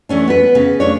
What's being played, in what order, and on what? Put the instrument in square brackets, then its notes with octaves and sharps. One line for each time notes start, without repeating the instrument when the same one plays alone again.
[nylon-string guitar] E3 A3 C#4 D4
B3 B4
C#3
A3 D4 C#5